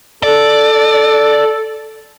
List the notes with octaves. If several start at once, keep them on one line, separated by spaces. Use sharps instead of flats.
A4 D5